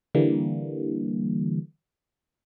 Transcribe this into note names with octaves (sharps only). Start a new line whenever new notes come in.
D3 E3 G3 A#3